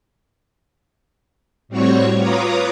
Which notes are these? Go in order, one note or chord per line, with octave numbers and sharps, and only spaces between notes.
A2 G3 C4 F#4 C#5 C#6
F4 B4 C#5 A#5 D6 D#6